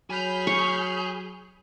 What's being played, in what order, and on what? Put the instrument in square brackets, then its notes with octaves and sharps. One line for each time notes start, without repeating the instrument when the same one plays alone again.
[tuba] F#3 [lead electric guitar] G#4 [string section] B5 F6 G6
[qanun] C#6